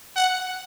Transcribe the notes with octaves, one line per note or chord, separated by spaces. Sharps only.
F#5